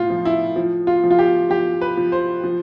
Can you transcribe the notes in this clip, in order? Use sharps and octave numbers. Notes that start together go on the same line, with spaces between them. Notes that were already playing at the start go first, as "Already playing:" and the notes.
Already playing: A2 F4
F3
E4
F3
F4
F3
F4
G4
F3 G4
B4
F3
C5
F3